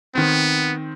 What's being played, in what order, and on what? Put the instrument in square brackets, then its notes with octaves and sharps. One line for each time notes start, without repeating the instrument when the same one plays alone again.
[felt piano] D#3 C4 [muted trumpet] B3